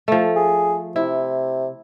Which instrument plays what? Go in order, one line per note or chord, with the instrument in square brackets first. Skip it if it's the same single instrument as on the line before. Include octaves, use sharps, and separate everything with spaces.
[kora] F3 A3
[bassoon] G#4
[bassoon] C3 [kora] E4